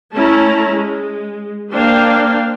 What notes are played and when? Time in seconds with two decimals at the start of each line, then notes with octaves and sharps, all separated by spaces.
0.13 A3 C#4 E4 A5 A#5
0.72 G#3
1.71 A#3 D4 C5 F5 G5